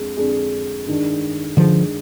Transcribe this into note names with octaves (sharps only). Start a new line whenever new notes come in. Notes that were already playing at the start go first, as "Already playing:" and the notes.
Already playing: F2 G#3 D4 G#4
F2 D3 G#3 D4 G#4
G2 D#3 G#3 D4
G2 D3 D#3 F3 G#3 D4